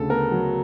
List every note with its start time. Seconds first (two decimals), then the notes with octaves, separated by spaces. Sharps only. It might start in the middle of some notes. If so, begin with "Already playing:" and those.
Already playing: D2 C#3 A4
0.10 B3 A#4
0.32 F#3